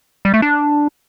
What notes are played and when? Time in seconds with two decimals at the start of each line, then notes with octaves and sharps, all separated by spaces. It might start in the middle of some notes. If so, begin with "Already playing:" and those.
0.25 G3
0.34 A3
0.42 D4